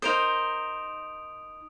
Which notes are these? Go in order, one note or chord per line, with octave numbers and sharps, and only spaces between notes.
D#4 A#4 C5 D#6 D7 F7